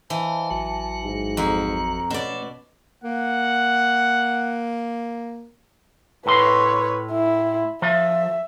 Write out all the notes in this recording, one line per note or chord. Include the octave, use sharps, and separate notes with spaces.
E3 C5 D#5 F5 A5
A1 F#3 F#4
G#2
F2 A#5
B2 A3 C#4 D5
A#3 F#5
A2 B4 C#5 C6
E4
F3 E5